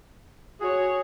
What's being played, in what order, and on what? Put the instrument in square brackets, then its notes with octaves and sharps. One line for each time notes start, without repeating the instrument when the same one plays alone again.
[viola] F#4 C#5 [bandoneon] G#4